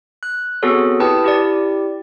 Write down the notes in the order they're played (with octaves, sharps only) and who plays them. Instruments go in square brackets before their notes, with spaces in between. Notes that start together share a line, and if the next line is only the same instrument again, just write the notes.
[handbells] F#6
B3 C4 F#4 G#4 A4 C#5
E4 G4 B4 G5 A5 D#6
E4 G4 D5